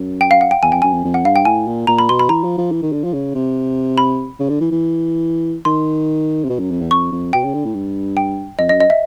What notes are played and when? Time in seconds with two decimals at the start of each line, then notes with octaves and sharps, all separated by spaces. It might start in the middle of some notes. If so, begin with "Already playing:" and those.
Already playing: F#2
0.21 G5
0.31 F5
0.41 F#5
0.51 G5
0.63 E2 G#5
0.72 F2 G5
0.82 F#2 G#5
0.94 F2
1.05 F2
1.14 F#5
1.25 G2 F5
1.36 G5
1.45 A2 G#5
1.67 A#2
1.87 A#2 A#5
1.99 B5
2.09 B2 C6
2.19 B5
2.29 E3 A#5
2.44 F3
2.58 F3
2.71 E3
2.82 D#3
2.92 D3
3.04 F3
3.13 C#3
3.35 C3
3.98 B5
4.39 C#3
4.49 D3
4.61 E3
4.71 E3
5.65 D#3 C6
6.44 C3
6.50 B2
6.59 F#2
6.71 F2
6.81 E2
6.91 F2 C#6
7.12 F2
7.33 B2 G5
7.44 C#3
7.54 D3
7.65 A2
7.74 G2
8.17 G5
8.59 F2 D#5
8.69 D#5
8.72 F#2
8.80 D#5
8.90 E5